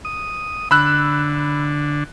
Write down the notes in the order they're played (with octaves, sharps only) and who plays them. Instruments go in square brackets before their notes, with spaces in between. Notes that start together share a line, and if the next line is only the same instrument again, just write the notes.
[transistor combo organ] D#6
[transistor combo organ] D3 [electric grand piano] B5 E6 F#6